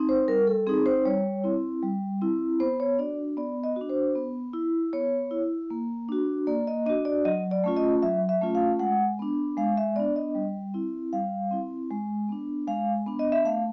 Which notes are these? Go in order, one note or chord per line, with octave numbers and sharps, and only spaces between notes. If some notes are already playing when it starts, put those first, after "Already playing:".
Already playing: C4 D#4
C5
G3 A#4
A4
C4 D#4 G#4
C5
G3 C#5
C4 E4
G3
C4 E4
B3 C5
C#5
D4 F#4 D5
B3 D5
D#5
D4 F#4
C5
B3
E4
B3 C#5
E4
A#3
D4 F#4
A#3 D5
D#5
D4 F#4 D#5
D5
F#3 D#5
D5
A3 C#4 F4
D#5
F#3 E5
E5
A3 C#4 F4
F5
G#3 F#5
B3 D4
G#3 F5
E5
B3 D4 D5
D#5
G3
C4 E4
G3 F5
C4 E4
G#3
B3 D4
G#3 F5
B3 D4
D#5
E5
A3 F5